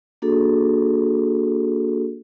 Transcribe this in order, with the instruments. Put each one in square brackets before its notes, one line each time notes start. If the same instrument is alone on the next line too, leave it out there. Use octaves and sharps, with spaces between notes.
[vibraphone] A#3 D4 F#4 G#4 A4